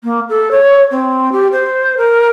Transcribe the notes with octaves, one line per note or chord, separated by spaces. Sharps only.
A#3
A4
C#5
C4
G4
C5
A#4